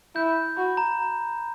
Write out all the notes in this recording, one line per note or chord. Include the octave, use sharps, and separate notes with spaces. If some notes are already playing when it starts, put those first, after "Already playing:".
E4 G6
F#4 B5
A#5